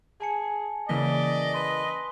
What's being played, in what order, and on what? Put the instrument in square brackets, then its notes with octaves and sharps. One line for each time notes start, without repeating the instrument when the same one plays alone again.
[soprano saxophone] G#4 [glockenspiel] G#5 A5 C#7
[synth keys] C#3 E3 A#3 [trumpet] D5 [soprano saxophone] D#5 [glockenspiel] B6
[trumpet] B4 [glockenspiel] C6